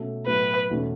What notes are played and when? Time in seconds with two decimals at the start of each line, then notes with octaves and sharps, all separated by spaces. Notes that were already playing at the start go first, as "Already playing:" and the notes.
Already playing: B2 A3 C#4
0.27 A2 F#3 B3 B4
0.70 E2 B2 A3 C#4